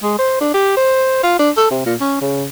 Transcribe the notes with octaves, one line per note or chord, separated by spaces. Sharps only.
G#3
C5
D4
G4
C5
F4
D4
A4
C3
A#2
C#4
C#3